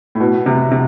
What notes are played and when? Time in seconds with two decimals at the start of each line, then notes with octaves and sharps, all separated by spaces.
0.15 A2
0.20 B2
0.46 C3
0.71 C3